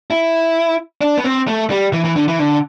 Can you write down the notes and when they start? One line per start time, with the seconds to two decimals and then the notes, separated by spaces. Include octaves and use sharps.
0.10 E4
1.01 D4
1.17 B3
1.24 C4
1.47 A3
1.70 G3
1.93 E3
2.05 E3
2.16 D3
2.28 E3
2.39 D3